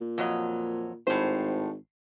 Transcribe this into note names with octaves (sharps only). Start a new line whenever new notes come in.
A#2
F2 F#3 D#5
G#1 A2 C5